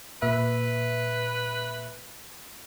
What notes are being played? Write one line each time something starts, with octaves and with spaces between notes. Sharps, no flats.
A#2 B4 E5